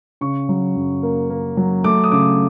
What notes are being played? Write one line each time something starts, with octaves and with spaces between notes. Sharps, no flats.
C#3 C#6
F#3
F#2
A#3
A#3
F#3
A3 D6
D#6
C#3 D6